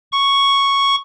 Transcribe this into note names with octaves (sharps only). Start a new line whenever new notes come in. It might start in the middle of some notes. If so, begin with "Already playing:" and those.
C#6